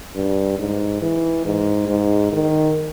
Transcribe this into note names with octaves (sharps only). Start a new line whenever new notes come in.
G2
G#2
E3
G#2
G#2
D#3